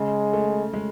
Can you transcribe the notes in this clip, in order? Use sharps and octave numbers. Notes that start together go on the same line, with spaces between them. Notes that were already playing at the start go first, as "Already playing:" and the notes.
Already playing: C#3 G#3
A3
G#3